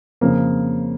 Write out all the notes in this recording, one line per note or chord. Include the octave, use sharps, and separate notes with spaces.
F2 C#3 F3 A#3